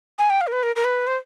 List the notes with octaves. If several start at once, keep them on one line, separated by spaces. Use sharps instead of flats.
G#5
G5
F5
A#4
B4
A#4
A#4
B4
C5